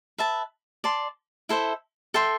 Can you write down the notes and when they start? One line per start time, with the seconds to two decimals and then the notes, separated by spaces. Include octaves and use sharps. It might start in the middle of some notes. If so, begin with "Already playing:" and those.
0.18 B4 E5 A5
0.84 D5 A5 C6
1.49 E4 A4 C5 E5
2.14 A4 E5 G5 C6